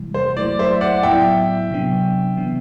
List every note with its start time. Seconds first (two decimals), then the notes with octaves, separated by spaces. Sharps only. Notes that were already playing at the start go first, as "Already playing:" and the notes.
Already playing: C3 E3 G3
0.14 C5
0.37 F#3 A3 E4 D5
0.59 C5 E5
0.81 D5 F#5
1.03 A2 F#3 B3 E4 E5 G5
1.71 C3 F#3 B3 D4
2.37 C3 E3 B3 D4